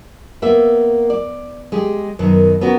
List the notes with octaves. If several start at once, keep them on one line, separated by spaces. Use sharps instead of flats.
A#3 B3 E5
D5
G#3 G4 G#4
F#2 B2 D#3
B3 C#4 F#4 A#4